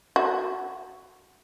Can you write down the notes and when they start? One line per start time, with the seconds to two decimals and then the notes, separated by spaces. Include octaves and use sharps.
0.16 F#4